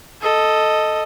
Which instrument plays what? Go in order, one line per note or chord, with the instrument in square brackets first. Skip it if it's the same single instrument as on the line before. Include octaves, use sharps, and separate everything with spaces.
[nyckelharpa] A4 D#5